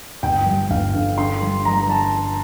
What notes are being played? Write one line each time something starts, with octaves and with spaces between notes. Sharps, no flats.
G1 G5
G3
G1 F5
D3
D3 C6
G3
G3 A#5
A5